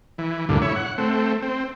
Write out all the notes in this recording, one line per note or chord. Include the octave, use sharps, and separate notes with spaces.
E3
D2 G2 A#2 D3
E4 C#5
F#5
A3 C4
C4